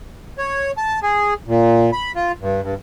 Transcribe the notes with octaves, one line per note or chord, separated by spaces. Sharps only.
C#5
A5
G#4
A#2
B5
F4
G2
G2